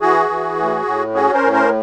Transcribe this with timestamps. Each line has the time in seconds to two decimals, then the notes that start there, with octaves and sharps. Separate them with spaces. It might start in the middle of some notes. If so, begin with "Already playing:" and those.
0.01 E3 F#4 G#4
0.29 E3
0.58 A2
0.86 A2
1.15 C#4 F#4 G#4
1.34 A#4 C5
1.43 A2
1.53 A#4 C5